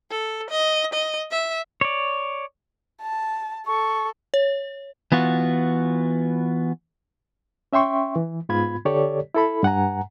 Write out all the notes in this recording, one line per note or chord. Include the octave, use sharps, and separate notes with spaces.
A4
D#5
D#5
E5
C#5 D5
A5
A4 C#6
C#5
E3 B3 F4 F#4
C#4 E5 G5 C6 C#6
E3
G#2 B3 F4 B5 G#6
D3 G4 A4 C#5 D5
E4 A4 B5
G2 F#5 G#5 A#5